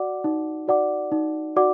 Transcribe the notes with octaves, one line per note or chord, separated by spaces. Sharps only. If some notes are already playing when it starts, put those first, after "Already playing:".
Already playing: F#4 D5 F#5 D6
D#4
F#4 D5 F#5 D6
D#4
F#4 D5 F#5 D6